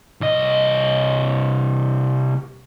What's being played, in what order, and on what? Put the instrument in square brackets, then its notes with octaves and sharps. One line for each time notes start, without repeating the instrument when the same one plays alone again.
[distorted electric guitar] C2 D#5